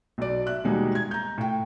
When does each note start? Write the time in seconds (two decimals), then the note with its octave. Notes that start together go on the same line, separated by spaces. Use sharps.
0.18 B1 D5
0.46 E5 F#6
0.64 D#2 B2 G3 G#3 D#4
0.95 G#6
1.11 A#5 G6
1.38 A2 G5